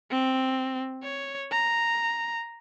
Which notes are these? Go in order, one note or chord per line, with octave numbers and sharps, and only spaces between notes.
C4
C#5
A#5